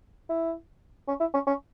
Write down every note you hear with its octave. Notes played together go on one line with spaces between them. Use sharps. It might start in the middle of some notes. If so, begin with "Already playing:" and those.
E4
C#4
E4
C#4
C#4